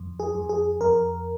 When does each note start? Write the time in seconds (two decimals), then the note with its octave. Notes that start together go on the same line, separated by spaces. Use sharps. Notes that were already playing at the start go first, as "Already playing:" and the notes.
Already playing: F2
0.20 G#4
0.35 F2
0.49 G#4
0.81 F2 A#4